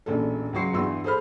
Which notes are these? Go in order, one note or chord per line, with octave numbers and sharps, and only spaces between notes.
E1 A#1 C#4 D4 A4
C#2 C#3 F#3 C6 C#6 C7
E2 G2 E3 F#4 C6 E6
G#4 A4 C5 B5 F6